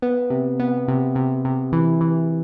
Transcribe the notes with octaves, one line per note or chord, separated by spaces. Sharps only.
B3
C3
B3
C3
C3
C3
E3
E3